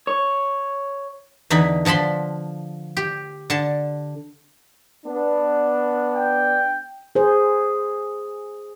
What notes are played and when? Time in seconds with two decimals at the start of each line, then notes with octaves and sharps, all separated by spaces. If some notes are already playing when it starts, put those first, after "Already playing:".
0.07 C#5
1.50 E2 D3 E3 D#4 B5
1.85 D3 F3 A5 B5 C6
2.97 G4
3.50 D3 A5
5.05 B3 D4
6.16 G5
7.15 G#4 C5